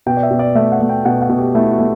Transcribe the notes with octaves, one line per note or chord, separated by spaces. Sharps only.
B2 G5
D5
E5
B2
D5
A3 E5
F#5
A3
G5
B2 F#5
F#5
B2
G4
A3 E4
F#4
A3